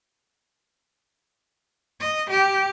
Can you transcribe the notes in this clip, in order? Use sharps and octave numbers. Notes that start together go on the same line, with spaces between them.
D#5
G4